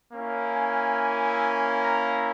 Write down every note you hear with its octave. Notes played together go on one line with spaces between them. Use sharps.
A#3 C#4 E4
G#5
A#5